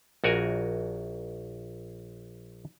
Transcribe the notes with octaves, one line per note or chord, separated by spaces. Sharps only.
A#1 F#4 A#4 G#5